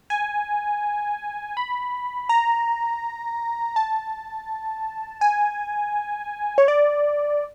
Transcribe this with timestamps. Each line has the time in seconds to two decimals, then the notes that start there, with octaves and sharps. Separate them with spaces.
0.10 G#5
1.57 B5
2.29 A#5
3.76 A5
5.21 G#5
6.58 C#5
6.68 D5